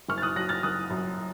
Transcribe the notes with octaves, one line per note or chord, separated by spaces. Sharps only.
F#1 C#6 F6
A6
D#6 F#6
F#3 F#6 A#6
F6 A6
F#1 D#6 F#6
F#2